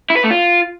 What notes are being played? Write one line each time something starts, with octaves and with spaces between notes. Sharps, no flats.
E4
B4
A3
F4